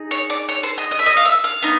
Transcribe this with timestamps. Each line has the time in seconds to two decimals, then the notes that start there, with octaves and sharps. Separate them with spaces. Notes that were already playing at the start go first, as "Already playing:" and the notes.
Already playing: D#4 G#4
0.11 C#5
0.30 D5
0.49 C#5
0.63 C5
0.78 D#5
0.91 D#5
0.99 E5
1.06 D#5
1.17 F5
1.25 E5
1.44 F5
1.62 B3 D#4